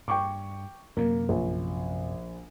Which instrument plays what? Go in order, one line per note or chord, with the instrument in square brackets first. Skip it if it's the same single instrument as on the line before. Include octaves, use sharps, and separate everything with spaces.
[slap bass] G2 [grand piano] G5 C#6 D6
[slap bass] F#2 C3 F#3 [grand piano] A#3
[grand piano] A#1